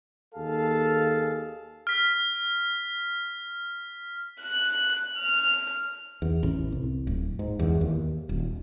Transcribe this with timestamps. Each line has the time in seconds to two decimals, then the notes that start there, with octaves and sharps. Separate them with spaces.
0.35 D#2 G#4 A4 F5 A5
1.87 F6 B6
4.43 F#6
5.20 F6
6.22 E2
6.43 A1
6.72 C2
7.07 D1
7.39 G#2
7.59 E2
7.81 D#2
8.29 D#1